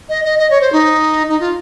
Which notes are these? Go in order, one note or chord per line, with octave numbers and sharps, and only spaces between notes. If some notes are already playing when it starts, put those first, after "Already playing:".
D#5
D#5
D#5
C#5
C5
D#4
D#4
F4